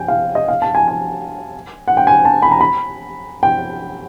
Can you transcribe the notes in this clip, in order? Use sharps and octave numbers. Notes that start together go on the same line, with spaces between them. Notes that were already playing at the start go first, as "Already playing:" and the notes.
Already playing: G5 G#5
F5
D#5
F5
A5
G#5
G#5
F#5
G5
G#5
A5
B5
A#5
B5
G5